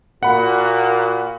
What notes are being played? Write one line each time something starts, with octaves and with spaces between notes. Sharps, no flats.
A#2 A#3 F#4 F#5 B5